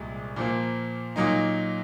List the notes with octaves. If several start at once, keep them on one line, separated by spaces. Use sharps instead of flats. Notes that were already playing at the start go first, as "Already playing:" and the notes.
Already playing: C2 A#2 G#3
A#2 F3 A#3
A#2 F#3 A#3 D#4